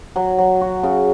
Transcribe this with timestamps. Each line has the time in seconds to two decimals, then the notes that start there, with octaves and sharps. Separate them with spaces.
0.16 F#3
0.38 F#3
0.61 F#4
0.83 C#3